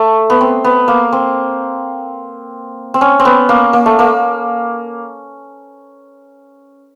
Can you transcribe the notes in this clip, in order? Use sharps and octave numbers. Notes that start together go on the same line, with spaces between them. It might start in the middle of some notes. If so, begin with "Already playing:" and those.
Already playing: A3
B3
C4
B3
A#3
C4
C4
C#4
C4
B3
A#3
A#3
A3
A#3